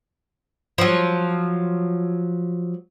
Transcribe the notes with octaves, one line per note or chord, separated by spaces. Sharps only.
F3 F#3